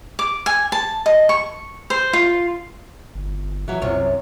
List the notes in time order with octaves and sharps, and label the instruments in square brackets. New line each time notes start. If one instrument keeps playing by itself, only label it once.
[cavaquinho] D6
G#5
A5
D#5
C#6
C5
F4
[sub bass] G1
[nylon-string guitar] E3 F#3
[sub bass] C2 [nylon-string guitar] F#2 C3 C#5